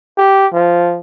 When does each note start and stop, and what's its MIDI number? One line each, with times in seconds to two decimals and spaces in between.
0.17 0.47 67
0.53 1.00 53